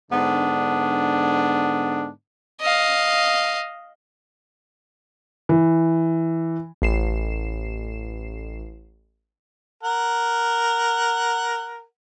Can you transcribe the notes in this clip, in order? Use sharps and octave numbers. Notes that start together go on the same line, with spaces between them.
G#2 D3 B3 D4
D#5 F5
E3
A1 C7 E7
A#4 F#5